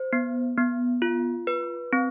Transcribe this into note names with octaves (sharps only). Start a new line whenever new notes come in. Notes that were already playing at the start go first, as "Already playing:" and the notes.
Already playing: C5
B3
B3
F4
B4
C4